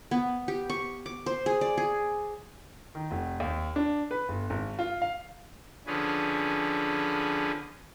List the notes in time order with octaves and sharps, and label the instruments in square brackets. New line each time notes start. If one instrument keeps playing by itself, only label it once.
[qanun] B3
G4
C#6
D6
C5
G#4
D5
G#4
[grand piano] D#3
F1
D#2
D4
B4
G1
G#1
F4
F5
[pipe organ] D3 F3 C#4 G#4 B4